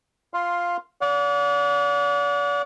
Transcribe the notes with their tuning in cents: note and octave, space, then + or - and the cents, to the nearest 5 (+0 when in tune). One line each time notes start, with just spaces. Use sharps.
F4 +0 F5 +0 C6 +10
D5 -40 F#5 -40